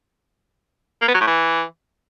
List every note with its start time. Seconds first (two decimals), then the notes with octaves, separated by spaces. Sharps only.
1.02 A#3
1.08 B3
1.14 F#3
1.21 A2
1.27 E3